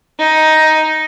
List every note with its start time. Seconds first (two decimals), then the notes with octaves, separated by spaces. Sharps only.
0.19 D#4